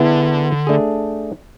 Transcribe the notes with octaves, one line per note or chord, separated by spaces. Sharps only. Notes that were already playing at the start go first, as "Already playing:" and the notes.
Already playing: D3 B3 E4 G#4
A3 D4 G#4